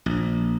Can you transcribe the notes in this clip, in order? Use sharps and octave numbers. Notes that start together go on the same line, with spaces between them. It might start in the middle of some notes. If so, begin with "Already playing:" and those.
A#1